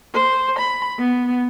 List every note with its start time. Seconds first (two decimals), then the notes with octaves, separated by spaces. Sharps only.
0.14 C5
0.59 B5
0.99 B3